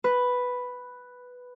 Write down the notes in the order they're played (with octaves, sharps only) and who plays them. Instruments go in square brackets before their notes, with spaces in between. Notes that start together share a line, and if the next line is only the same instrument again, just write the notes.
[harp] B4